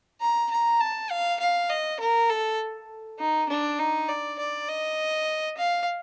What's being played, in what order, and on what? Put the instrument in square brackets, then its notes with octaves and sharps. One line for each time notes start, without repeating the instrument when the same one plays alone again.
[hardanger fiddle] A#5
A#5
A5
F5
F5
D#5
A#4
A4
D#4
D4
D#4
D5
D5
D#5
F5